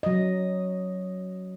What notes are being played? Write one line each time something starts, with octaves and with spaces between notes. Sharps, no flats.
F#3 D#5